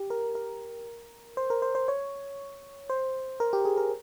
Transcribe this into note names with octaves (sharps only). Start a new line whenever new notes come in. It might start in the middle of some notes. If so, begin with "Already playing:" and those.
Already playing: G4
A#4
A#4
C5
A#4
C5
C5
C#5
C5
A#4
G4
G#4
A#4